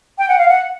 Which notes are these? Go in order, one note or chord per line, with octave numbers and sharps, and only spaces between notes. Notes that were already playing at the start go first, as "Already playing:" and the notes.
G5
F#5
F5
F#5